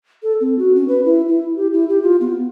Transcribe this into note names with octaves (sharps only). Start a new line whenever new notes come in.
A4
C4
F#4
C#4
B4
E4
E4
G4
E4
G4
F4
B3